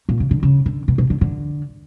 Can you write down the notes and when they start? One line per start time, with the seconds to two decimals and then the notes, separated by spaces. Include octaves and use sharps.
0.09 A#2
0.20 C#3
0.31 D3
0.43 C#3
0.66 D3
0.88 B2
0.98 B2
1.10 D3
1.21 D3